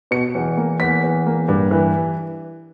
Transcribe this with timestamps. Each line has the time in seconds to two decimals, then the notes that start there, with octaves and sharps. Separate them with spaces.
0.11 B2 C#7
0.35 E2
0.57 A#3
0.80 E2 B6
1.04 E2
1.26 A#3
1.48 G2
1.71 E3